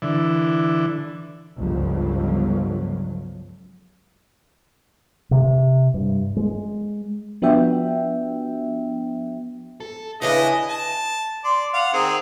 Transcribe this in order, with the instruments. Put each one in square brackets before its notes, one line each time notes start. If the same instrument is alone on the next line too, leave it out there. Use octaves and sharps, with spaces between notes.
[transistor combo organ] D3 E3
[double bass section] G1 C#2 F3 F#3
[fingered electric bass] C3
G2
G#3
[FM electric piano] F3 B3 D4 F#4 E5 G5
[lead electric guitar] A4
[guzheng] C#3 C#4 D4 [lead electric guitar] E4 [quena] B4 [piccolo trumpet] D#5
[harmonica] A5
D5 C6
F5 F#5
D#3 C4 G#4